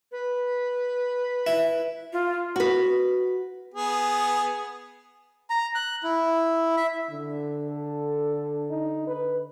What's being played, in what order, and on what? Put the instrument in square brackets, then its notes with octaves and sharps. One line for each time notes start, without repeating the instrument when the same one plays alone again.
[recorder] B4
[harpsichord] E4
[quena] F4
[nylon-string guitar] F#4 B4
[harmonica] B3 G#4
[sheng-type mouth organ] A#5
F#6
E4
E5
[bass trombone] D3
[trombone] A4
D#4
B4